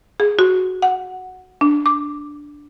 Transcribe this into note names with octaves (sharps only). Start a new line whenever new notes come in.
G#4
F#4
F#5
D4
D6